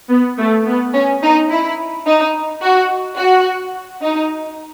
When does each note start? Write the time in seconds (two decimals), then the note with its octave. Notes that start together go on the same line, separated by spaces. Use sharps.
0.10 B3
0.39 A3
0.66 B3
0.94 C#4
1.22 D#4
1.51 E4
2.06 D#4
2.63 F#4
3.19 F#4
4.03 D#4